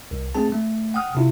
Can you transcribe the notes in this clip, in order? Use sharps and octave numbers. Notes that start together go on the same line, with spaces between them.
C2
A3 C4 G#4 A5
A3
F#5 G5 D#6 F6
C3 E4 F4